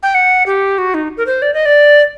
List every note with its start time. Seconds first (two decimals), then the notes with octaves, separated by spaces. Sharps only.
0.03 G5
0.15 F#5
0.46 G4
0.78 F#4
0.94 D#4
1.17 A#4
1.26 C5
1.42 D5
1.54 D#5
1.66 D5